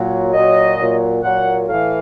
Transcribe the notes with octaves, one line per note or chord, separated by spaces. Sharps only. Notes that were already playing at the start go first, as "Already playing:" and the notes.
Already playing: A#2 F#3
A#2 F#3 D#5
A#2 F#3
A#2 F#3 F#5
A2 E3 F5